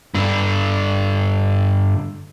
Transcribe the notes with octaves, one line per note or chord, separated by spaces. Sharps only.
G2 D3